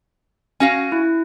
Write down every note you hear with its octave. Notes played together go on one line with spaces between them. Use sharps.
C#4 F#4 F5 G#5
E4